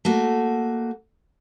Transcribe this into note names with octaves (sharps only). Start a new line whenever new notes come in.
A3 A#3 F#4